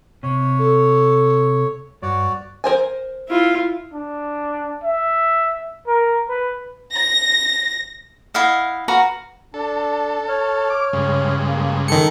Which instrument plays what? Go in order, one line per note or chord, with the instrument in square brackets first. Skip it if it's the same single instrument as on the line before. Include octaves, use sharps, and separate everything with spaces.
[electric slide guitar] C3 [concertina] C#5
[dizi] A4
[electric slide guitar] G2 [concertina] F#4 C#5 D5
[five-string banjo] A#4 C5 G#5
[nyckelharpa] E4 F4
[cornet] D4
E5
A#4
B4
[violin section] A#6
[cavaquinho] E4 D#5 F5 F#5
F#4 B4 F5 A#5
[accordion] D4 [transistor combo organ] A4
[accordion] C#5 F6
[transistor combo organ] D6
G2 C#3 G#3
[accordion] A#3
[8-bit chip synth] D#3 C#7 [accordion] A4